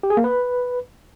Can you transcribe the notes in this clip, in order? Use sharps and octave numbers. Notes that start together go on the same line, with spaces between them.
G4
G#4
A#3
B4